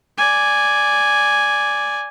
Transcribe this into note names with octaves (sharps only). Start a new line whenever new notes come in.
D5 G#5